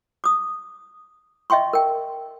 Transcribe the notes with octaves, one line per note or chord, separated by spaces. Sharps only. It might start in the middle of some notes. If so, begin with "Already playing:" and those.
D6 D#6
D#5 E5 G5 C6 C#6
A#4 G5